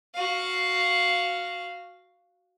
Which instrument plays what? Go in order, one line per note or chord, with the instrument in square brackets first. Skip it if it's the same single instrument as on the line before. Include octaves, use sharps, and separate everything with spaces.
[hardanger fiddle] F#4 F5